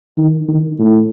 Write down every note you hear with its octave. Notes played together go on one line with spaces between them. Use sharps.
D#3
D#3
A2